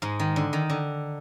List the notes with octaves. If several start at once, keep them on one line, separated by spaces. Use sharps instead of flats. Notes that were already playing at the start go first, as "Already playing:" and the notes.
G#2 G#3
D#3
D3
D#3
D3